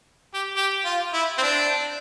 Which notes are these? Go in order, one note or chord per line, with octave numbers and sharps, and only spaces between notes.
G4
G4
F4
E4
C4
D4